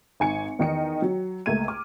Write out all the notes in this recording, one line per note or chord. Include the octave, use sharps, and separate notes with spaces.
G#1 G#5 C#7
E2 D#3 D#4 D#5 C#7
F#3
C#2 A3 A#3 G#6 D#7
D6 F6